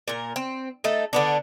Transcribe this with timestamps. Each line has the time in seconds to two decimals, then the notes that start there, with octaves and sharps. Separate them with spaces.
0.08 A#2 A#4
0.36 C4
0.84 A3 D#4 A4
1.13 D3 B3 D4